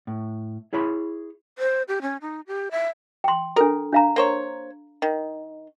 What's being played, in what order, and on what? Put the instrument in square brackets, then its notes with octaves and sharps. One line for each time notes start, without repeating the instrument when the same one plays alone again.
[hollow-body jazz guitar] A2
E4 G#4 C#5 B5 C6
[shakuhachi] C5
G4
C#4
D#4
G4
E5
[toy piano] G5 C6
[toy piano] D4 A4 [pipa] A#4
[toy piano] D4 F5 A#5
[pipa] A#3 C5 C#5
D#3